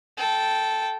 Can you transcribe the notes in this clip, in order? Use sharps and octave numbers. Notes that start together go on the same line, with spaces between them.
A4 G5